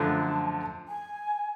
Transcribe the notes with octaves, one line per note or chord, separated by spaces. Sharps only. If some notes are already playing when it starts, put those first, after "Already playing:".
Already playing: F#2 D3 F3 A3 A5
G#5